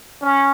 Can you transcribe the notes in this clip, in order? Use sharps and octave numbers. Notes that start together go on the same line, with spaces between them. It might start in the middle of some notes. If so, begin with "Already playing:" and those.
C#4